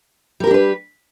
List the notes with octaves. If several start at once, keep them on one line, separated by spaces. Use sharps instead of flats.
G3 D4 G4 A#4 B4